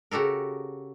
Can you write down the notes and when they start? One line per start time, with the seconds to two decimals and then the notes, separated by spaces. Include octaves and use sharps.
0.11 C#3 F#4 G4 A4 A#4